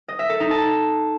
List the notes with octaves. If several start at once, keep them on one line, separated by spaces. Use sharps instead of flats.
D#5
E5
A4
D#4
A5